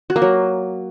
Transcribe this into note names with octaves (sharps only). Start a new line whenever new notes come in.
F#4
A#3
F#3